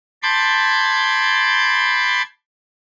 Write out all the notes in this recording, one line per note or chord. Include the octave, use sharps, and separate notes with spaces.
A5 B5 C6 D6 G6 G#6